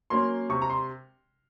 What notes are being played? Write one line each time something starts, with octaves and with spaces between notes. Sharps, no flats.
F#3 A#3 C#4 C6
C3 C#6
A#5
C6